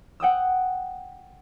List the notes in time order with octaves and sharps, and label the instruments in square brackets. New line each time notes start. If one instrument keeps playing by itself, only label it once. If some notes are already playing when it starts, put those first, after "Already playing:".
[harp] F#5 G5 D#6 E6